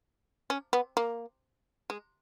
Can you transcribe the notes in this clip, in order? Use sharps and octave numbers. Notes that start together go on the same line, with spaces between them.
C#4
B3
A#3
G#3